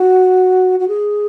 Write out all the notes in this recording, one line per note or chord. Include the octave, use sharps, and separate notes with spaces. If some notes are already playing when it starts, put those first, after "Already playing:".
Already playing: F#4
F#4
G#4